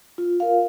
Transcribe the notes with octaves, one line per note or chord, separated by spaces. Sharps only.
F4
A#4 F5